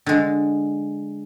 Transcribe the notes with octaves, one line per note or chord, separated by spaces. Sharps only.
D3 G#3